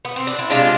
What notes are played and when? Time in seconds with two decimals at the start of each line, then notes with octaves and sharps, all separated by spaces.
0.05 B3
0.16 C4
0.27 D4
0.39 E4
0.50 C3 G#3 D4 F4